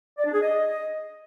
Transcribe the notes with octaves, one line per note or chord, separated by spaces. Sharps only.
D5
D4
G#4
D#5